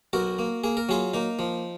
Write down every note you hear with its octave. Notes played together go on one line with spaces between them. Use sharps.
B1 F#4 A#4
A#3
A#3 G#4
A#4
F#3 F4 G#4
A#3 D#4
F3